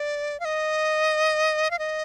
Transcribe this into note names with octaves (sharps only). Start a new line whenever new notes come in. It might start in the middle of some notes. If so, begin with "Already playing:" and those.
Already playing: D5
F5
D#5
F5
D#5